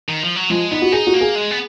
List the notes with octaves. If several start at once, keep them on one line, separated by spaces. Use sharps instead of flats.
D#3
F3
F#3
F3 G#3
B3 D#4
F#4
D#4 G#4
F#4
A#3
G#4
G#3
B3